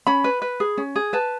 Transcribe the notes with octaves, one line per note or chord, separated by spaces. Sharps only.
C#4 B5
B4
B4
G#4
C#4
G#4
B4 A5